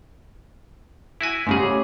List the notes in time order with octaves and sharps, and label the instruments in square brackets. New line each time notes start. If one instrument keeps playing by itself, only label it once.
[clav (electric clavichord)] E4 F#4 G#5
[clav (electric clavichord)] G#2 C#3 G#4 [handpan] A3 C#4 G4